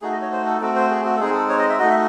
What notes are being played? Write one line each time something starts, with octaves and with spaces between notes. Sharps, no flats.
A3 D#4 F#4 G#4
D#5
C#5
C5
A4
A3 C4 F#4 A4
C5
G#4
F#4
A4
G#3 C4 D#4 G#4
A4
C#5
D#5
E5
A3 D#4 F#4 D#5
E5